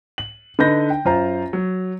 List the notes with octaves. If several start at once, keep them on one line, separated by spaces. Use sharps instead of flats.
F#7
D3 D#4 B4 G6 A#6
G5
F#2 F4 C5 A#5
F#3